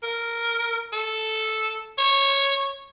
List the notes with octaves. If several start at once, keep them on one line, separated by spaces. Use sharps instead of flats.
A#4
A4
C#5